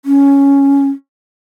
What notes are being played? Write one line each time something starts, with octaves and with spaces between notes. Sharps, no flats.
C#4